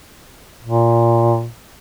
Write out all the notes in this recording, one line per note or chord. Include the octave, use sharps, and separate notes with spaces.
A#2